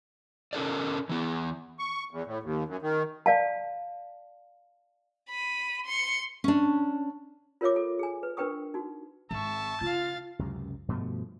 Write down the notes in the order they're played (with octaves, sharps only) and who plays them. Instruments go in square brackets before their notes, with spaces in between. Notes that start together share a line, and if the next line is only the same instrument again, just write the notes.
[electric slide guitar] C#4 A4 A#4 D5
E3 B3
[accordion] C#6
E2
A2
D#2
F#2
D#3
[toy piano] D5 F5 A5
[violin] B5 D#7
C6 C#7
[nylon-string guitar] C#4 D4
[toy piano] F4 A#4 C#5 E5 D6
A4
G#4 G#5
B4
D4 A#4 B4 G5 C#6 D#6
D#4 F#4
[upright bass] G#1 [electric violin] E5 C#6 [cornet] A5
[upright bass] C#3 [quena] F4 [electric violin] F5 A6
[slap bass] C#2 F#2 C3
G2 B2 F3 A3